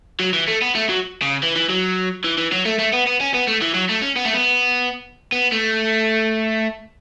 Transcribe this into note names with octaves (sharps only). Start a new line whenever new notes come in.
F#3
E3
A3
B3
A3
F#3
C#3
E3
E3
F#3
E3
E3
F#3
A3
A3
B3
B3
C#4
B3
A3
E3
F#3
A3
C#4
B3
A3
B3
B3
A3